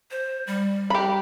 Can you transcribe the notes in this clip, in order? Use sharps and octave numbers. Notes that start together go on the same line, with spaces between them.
C5
G3
G4 B5